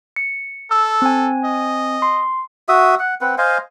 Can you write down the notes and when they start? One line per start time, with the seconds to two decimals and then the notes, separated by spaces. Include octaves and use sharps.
0.16 C#7
0.71 A4 E6
1.02 C4 G#5
1.44 D#5
2.02 C6
2.69 F#4 E5 D#6
2.99 F#5
3.21 C4 B4 F#5
3.38 C5 D#5 F5 G#5